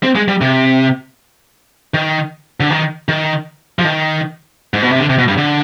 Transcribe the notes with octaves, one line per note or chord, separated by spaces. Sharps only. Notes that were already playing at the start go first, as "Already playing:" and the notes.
C4
G#3
G3
C3
D#3
D3
D#3
D#3
F3
D#3
G#2
B2
C3
D3
C3
B2
G2
D3